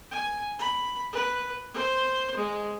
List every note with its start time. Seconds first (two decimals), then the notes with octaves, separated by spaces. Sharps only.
0.11 G#5
0.59 B5
1.13 B4
1.74 C5
2.36 G#3